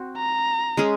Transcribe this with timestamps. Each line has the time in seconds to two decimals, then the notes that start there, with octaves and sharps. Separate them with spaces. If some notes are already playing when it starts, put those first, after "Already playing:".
Already playing: C4 F#4
0.17 A#5
0.77 G#3 C#4 G#4